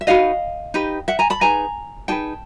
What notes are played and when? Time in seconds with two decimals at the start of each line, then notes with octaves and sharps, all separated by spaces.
0.01 E5
0.07 D#4 F#4 B4 D#5 F5
0.74 D#4 G4 B4
1.08 E5 F#5
1.19 G#5 A#5
1.30 A5 B5
1.41 D#4 G#4 B4 G#5 A#5
2.08 D#4 G#4 B4 G5 A5